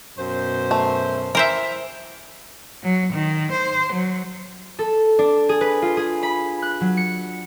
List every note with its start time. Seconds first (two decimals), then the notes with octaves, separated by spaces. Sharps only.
0.18 F#2 B2 C5
0.71 A3
1.35 E3 A#4 C5 E5
2.83 F#3
3.13 D#3
3.52 C5
3.93 F#3
4.79 A4
5.19 D4
5.49 G#4
5.61 B4
5.82 F4
5.97 G#4
6.23 B5
6.62 F#6
6.81 F#3
6.97 C#7